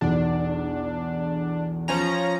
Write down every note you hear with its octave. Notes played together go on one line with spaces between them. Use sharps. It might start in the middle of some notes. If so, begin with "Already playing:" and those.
B1 E2 D4
F3 C#4 A#5